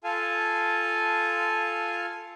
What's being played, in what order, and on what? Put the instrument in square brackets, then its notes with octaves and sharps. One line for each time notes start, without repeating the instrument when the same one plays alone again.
[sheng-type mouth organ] F4 A4 F5 G#5 A5